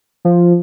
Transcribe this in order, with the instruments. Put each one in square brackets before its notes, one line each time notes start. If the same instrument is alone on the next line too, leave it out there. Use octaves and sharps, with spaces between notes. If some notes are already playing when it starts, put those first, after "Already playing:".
[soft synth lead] F3